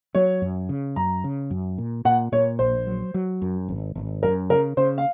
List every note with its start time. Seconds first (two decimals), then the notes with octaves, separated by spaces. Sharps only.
0.15 F#3 C#5
0.42 F#2
0.69 C#3
0.96 F#2 A#5
1.24 C#3
1.51 F#2
1.78 A#2
2.05 A#2 F#5
2.32 A#2 C#5
2.59 A#1 C5
2.87 F#3
3.14 F#3
3.42 F#2
3.68 G#1
3.95 G#1
4.23 F#2 A#4
4.50 C#3 A#4
4.77 C#3 C5
4.98 F5